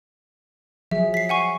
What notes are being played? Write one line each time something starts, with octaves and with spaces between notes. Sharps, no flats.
F3 F#3 G#4 E5
B6 C7
F#5 G#5 C#6